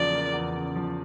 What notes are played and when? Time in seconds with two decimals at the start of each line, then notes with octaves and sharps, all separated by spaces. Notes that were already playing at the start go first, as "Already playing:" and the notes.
Already playing: E2 C#3 F3 A#3 D5
0.12 A#3
0.33 E2
0.55 C#3
0.76 F3